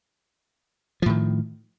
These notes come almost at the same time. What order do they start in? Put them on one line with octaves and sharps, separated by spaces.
F3 A2 D#3